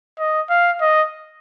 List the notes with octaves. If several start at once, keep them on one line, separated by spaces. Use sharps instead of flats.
D#5
F5
D#5